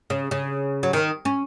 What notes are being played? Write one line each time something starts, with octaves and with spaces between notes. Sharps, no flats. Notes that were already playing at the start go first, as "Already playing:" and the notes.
C#3
C#3
F#3
D#3
C#4